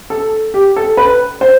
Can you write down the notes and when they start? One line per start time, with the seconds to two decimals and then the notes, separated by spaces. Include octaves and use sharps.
0.10 A4
0.54 G4
0.76 A4
0.97 B4
1.41 C5